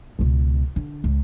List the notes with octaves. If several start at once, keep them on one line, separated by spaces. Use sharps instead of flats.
C#2 B2
D3
C#2